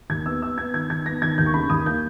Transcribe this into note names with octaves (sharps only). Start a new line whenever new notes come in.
D#2 G#6
B3 E6
B3 E6
B3 G#6
D#3 G#6
D#3 G#6
B3 A#6
D#3 G#6
D#2 G6
C#6
C#3 B5
D#2 D#6
A#3 G6